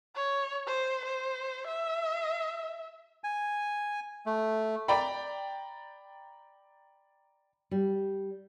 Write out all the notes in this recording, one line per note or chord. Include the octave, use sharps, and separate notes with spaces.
C#5
C5
C5
E5
G#5
A3
D5 G5 A#5 B5
G3